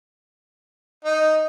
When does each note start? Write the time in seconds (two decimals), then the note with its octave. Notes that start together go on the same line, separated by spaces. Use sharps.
1.05 D#4